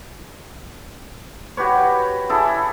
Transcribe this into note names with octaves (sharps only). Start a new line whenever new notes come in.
F#4 G4 B4 C#5
E4 G#4 A4